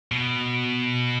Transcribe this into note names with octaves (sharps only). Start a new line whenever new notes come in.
B2